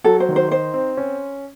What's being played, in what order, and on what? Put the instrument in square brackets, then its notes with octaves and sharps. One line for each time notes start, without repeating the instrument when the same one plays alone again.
[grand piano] F#3 [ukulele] A4
[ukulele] C5
[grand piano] D#3
[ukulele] C5
[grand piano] D#4 [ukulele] C5
[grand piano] C4
C#4